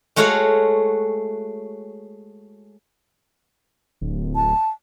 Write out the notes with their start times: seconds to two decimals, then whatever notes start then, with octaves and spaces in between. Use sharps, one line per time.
0.16 G#3 A3 F#4 C#5 F5 F#5
4.01 D1
4.35 A5